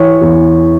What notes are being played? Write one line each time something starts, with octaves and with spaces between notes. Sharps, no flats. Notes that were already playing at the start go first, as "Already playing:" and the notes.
Already playing: E3 C#5
E2